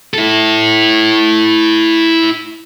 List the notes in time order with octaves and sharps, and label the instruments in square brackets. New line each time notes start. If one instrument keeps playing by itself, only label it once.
[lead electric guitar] E4 A4